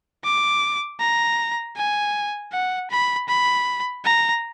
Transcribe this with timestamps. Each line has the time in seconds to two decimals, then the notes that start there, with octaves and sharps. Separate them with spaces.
0.25 D6
1.00 A#5
1.76 G#5
2.52 F#5
2.90 B5
3.29 B5
4.05 A#5